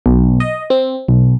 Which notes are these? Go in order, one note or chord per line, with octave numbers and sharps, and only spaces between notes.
B1
D#5
C4
B1